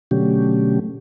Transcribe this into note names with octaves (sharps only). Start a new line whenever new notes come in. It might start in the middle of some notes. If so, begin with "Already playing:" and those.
B2 D3 F#3 A3 C#4 G4